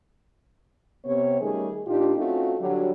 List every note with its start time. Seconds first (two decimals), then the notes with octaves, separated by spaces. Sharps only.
1.05 C3 B3 C#5
1.41 D#3 G3 A3 C#4 G#4
1.87 A#2 D4 D#4 F4 G4
2.17 A3 C4 C#4 D#4 F4 F#4
2.60 D3 F#3 G3